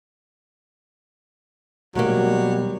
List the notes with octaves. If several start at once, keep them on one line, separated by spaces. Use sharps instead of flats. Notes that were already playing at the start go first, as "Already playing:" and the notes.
D#2 B2 F#3 G3 A3 A#3